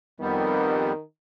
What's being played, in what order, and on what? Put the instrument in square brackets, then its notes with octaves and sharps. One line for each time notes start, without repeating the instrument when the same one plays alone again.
[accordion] F2 G3 B3 [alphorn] D#3